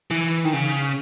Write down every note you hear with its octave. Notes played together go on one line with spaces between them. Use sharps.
E3
D#3
C#3